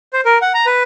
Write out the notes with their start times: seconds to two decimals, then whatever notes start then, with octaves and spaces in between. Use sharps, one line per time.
0.13 C5
0.25 A#4
0.42 F#5
0.54 A#5
0.66 B4